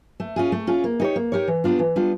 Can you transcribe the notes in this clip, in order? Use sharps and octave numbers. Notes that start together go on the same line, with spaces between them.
A3
C#4 F4 G#4
A3
C#4 F4 G#4
A#3
D#4 G4 A#4 C#5
A#3
D#4 G4 A#4 C#5
E3
G3 B3 D4 F4
E3
G3 B3 D4 F4